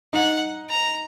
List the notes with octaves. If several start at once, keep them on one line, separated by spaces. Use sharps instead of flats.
D#4 F#5
A#5